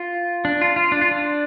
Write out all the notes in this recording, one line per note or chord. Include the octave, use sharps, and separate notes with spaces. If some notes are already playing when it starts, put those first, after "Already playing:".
Already playing: F4
D4
F4
F4
D4
F4
D4